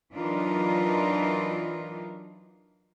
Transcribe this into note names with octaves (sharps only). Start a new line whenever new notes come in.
E3 F#3 D4 D#4 F4 A#4